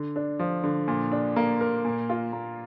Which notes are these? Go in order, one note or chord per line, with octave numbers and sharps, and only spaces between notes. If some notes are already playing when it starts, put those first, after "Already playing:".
Already playing: D3
D4
F3
D3
A#2
D4
A#3
A#4
A#2
F4
A#3